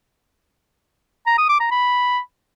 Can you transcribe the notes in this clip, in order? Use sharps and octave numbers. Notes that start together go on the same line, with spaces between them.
A#5
D#6
D6
A#5
B5